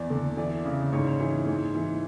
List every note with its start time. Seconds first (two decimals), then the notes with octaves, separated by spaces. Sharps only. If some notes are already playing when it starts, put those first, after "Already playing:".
Already playing: E2 D5
0.10 D3
0.37 E3 D5
0.65 C#3
0.93 G#2 C#5
1.20 E3
1.46 G#2
1.75 E3